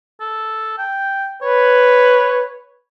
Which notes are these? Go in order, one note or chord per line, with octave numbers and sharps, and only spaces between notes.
A4
G5
B4 C#5